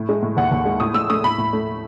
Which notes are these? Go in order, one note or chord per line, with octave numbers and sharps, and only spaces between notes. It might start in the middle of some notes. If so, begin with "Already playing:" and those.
Already playing: A2
G#3
A2
D#2 F#5
D#2
G#3
A2 D#6
A2 E6
A3 D#6
A2 B5
A2
A3